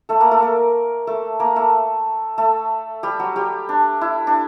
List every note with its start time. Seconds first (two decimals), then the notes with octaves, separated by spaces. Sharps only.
0.09 A3 A4
0.20 A#3 A#4
0.31 A3 A4
0.42 A#3 A#4
1.07 A3 A4
1.40 A#3 A#4
1.56 A3 A4
2.38 A3 A4
3.03 G3 G4
3.19 F#3 F#4
3.36 G3 G4
3.69 D4
4.01 E4
4.27 D4